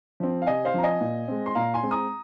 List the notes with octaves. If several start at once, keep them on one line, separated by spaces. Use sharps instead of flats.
F3 C4
F5
C3 D#5 G#5
C5 F5
F3 C4 A#5
D#5 G#5
A#2
G#3 C4
C6
A#2 F5 A#5
G#5 C6
G#3 C4
A#5 D#6